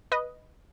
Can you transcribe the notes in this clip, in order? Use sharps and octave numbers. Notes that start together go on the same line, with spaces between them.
B4 D#5